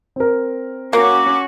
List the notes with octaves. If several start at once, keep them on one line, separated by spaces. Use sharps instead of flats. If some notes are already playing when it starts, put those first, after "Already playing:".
C4 A#4
A#3 C#4 F#4 D6